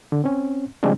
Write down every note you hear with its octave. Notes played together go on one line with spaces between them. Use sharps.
D3
C4 C#4
C#3 F3 G3 G#3 C4 D4